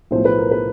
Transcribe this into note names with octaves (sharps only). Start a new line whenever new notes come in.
B1 A2 F3 A3 C5
B4
A#4
B4